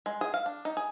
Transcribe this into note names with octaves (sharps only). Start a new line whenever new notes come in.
G#3
G#4
F5
D4
D#4
G#4